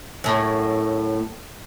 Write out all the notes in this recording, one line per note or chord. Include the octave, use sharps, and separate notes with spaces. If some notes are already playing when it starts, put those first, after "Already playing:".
F#2 A2